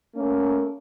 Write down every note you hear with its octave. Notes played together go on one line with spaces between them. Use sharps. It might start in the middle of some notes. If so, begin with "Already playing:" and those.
A3 A#3 C#4